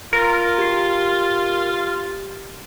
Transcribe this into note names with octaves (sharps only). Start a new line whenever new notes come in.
F4 A#4
G4 C7